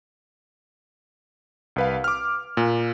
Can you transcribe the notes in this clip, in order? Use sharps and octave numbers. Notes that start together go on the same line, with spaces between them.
C2 B4 F5
D6 F6
A#2